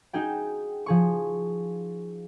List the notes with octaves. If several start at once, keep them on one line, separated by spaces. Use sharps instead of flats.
D#4 F#4 G#4 G5
F3 G#4 C#6